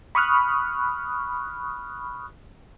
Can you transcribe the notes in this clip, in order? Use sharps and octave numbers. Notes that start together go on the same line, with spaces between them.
B5 C#6 D#6 F6 F#6